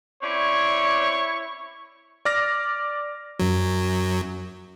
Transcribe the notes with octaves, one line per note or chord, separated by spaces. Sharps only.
C4 C#4 E4 C#5 D5 C#6
D5 D6 F6 A#6
F#2 F#3